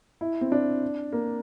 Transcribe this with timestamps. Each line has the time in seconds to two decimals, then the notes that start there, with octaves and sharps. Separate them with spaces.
0.21 E4
0.41 C4
0.52 D4
1.13 A#3